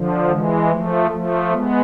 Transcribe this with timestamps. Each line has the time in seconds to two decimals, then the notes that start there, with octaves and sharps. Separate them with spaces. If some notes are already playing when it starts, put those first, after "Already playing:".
Already playing: D3 F3
0.29 E3 G#3
0.70 F3 A3
1.10 F3 A3
1.52 G#3 B3